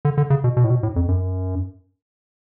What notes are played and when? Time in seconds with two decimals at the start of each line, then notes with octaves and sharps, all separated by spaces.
0.05 D3
0.18 D3
0.30 C#3
0.44 B2
0.57 B2
0.64 A2
0.70 B2
0.83 A2
0.96 F2
1.08 F#2